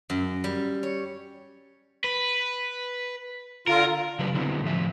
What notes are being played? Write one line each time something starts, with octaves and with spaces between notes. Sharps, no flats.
F#2
G3
C#5
B4
D3 F4 A#4
C#3 F#3 G3 A3 D4 B4
D3 F#3 G3 B3 C4 E4
A2 F3 E5